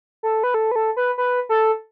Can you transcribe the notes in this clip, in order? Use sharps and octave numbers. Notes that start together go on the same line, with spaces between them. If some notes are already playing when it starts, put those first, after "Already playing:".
A4
B4
A4
B4
A4
B4
B4
A4